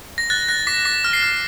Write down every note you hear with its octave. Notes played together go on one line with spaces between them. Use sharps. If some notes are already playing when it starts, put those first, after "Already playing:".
A#6
F#6 A6
F#6 A#6
D6 B6
D6 B6
F6
C7
F6